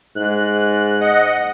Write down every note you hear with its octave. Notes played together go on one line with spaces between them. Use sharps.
G#2 F#6
D#5 F#5